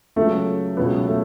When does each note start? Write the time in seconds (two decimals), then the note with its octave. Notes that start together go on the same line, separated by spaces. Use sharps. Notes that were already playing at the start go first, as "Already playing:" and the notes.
0.16 C#2 C#3 F#3 A3
0.77 C#2 B2 F#3 B3 C#4
1.07 A3